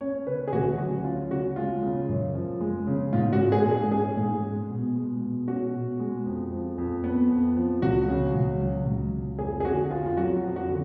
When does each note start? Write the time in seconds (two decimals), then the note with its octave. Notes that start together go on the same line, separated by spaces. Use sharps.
0.01 C#4 C#5
0.27 C#3 B4
0.47 G#4
0.53 D2 F#4
0.78 F#3 F#4
1.04 C#4 F4
1.30 C#3 F#4
1.56 G#3 F4
1.83 C#3
2.09 F#2
2.35 F3
2.61 G#3
2.87 C#3
3.13 G#2 F4
3.33 F#4
3.39 G#3
3.52 G#4
3.65 G#2
3.71 G#4
3.91 C#4 G#4
4.17 G#2
4.43 G#3
4.69 B2
4.96 G#3
5.21 B2
5.48 C#4 F#4
5.74 B2
6.00 G#3
6.26 F2
6.52 F3
6.78 F2
7.04 B3
7.30 F2
7.57 F3
7.82 C#2 F#4
8.08 C#3
8.34 C#2
8.60 F#3
8.86 C#2
9.13 C#3
9.39 F2 G#4
9.60 G#4
9.65 D3 F#4
9.90 F2 F4
10.06 F4
10.17 F#3 F#4
10.43 F2
10.56 F#4
10.68 D3